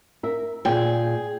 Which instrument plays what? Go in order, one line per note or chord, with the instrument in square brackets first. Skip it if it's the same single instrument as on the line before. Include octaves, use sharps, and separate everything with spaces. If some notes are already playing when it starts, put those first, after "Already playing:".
[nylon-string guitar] A#4 E5
[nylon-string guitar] A#2 G5 [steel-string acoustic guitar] G#4